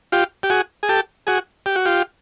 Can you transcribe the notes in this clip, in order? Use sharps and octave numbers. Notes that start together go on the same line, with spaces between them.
F4 G4
G4
F#4 G#4
G#4
G4 A4
F#4 G#4
G4
F#4
F4 G4